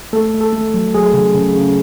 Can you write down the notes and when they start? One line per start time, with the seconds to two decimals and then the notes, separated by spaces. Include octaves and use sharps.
0.13 A3 A4
0.34 A3
0.41 A4
0.53 A3
0.74 F#3
0.94 F#3 G#4
1.14 C#3
1.34 C#3
1.55 C#3